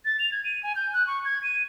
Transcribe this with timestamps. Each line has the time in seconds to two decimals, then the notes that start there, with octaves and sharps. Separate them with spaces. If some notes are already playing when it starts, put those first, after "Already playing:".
0.05 A6
0.19 F7
0.32 G#6
0.44 D#7
0.63 G#5
0.76 G6
0.93 F#6
1.07 C#6
1.25 G#6
1.43 D#7